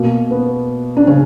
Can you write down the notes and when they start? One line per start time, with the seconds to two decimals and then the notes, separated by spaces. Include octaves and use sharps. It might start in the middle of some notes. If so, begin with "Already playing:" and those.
Already playing: B2 A#3
0.31 B3
0.97 D4
1.07 C#3 C#4